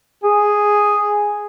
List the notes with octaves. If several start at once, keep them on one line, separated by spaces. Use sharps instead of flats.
G#4